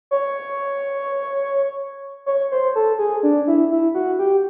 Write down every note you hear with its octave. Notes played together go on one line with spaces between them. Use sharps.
C#5
C#5
C5
A4
G#4
D4
E4
E4
F#4
G4